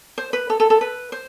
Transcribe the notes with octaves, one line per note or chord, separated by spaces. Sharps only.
C5
B4
A4
A4
A4
B4
C5